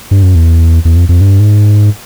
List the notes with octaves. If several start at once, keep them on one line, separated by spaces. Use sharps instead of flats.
G2
F#2
E2
E2
F2
F2
G2
G#2